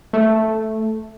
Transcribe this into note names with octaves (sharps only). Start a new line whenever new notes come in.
A3